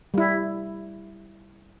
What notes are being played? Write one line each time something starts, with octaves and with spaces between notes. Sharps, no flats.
G3 E4